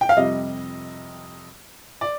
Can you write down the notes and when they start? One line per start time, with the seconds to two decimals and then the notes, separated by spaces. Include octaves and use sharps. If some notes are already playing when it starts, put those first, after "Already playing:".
0.01 G5
0.09 F5
0.17 F2 C3 G3 D#5
2.01 D5